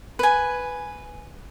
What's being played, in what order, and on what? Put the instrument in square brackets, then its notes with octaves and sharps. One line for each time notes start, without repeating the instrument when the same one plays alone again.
[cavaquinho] B4 G#5